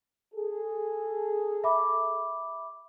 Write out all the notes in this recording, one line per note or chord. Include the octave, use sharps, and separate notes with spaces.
G#4 A4
E5 B5 D6